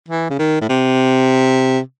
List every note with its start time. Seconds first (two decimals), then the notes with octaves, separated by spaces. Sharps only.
0.09 E3
0.30 C#3
0.39 D#3
0.61 A2
0.69 C3